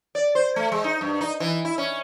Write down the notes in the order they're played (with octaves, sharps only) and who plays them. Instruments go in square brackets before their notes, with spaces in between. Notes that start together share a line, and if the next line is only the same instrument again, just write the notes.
[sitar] D5
C5
A3
G#3
D#4
G2
D#4
E3
E4
C#4